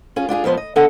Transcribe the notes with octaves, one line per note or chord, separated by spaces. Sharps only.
C#4 F4 G#4
D4 F4 G4 G#4
F2 F3 B3 C5 C#5
D#5
B3 D4 A4 D#5 F#5